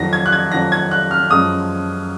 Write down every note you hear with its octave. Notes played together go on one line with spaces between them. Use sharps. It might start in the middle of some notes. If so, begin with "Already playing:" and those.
Already playing: F2 D#3 F#3 A#6
G#6
F#6
G#6
F2 D#3 F#3 A#6
G#6
F#6
F6
F#2 F3 G#3 D#6